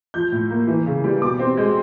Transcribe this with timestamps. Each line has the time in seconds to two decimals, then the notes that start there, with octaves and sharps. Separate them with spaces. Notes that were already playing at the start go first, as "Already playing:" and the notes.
0.14 F3 G6
0.32 A2
0.50 A#3
0.67 E3
0.86 C#3
1.04 G3
1.21 B2 D6
1.39 C4
1.57 G#3